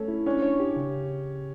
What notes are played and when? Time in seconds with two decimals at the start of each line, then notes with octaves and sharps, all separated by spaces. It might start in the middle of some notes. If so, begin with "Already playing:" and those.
Already playing: A3 C#4 A4
0.08 E4
0.26 C#4 D4
0.43 C#5
0.60 G4
0.77 C#3